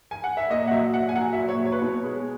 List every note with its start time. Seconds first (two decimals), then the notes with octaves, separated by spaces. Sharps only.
0.11 G#5
0.24 F#5
0.37 E5
0.50 A#2 D#5
0.68 F#5
0.71 F#3 E5
0.93 A#2 F#5
1.09 G#5
1.16 F#3 F#5
1.33 E5
1.38 A#2
1.49 C#5
1.59 F#3
1.65 C#5
1.72 B4
1.79 B2 C#5
2.04 G#3